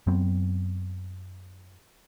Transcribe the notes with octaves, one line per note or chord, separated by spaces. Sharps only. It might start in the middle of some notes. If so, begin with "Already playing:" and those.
F#2 F#3 B3 C4